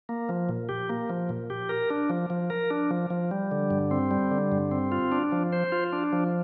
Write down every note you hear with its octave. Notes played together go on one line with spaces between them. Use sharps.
A#3
F3
A#2
G4
A#3
F3
A#2
G4
A#4
D4
F3
F3
A#4
D4
F3
F3
G3
D3
G2
C4
G3
D3
G2
C4
F4
D4
F3
C5
F4
D4
F3